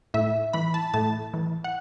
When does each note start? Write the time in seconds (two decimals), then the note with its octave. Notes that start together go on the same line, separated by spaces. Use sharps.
0.14 A2 E5
0.53 E3 B5
0.74 A5
0.94 A2 A5
1.34 E3
1.64 F#5